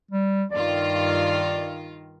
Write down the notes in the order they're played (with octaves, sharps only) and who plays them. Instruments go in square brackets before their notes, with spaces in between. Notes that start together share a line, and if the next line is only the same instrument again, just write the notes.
[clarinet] G3
[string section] G2 D#3 F4 [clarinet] D5